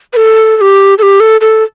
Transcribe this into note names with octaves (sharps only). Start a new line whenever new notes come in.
B4
A4
A4
G4
A4
G4
A4
A4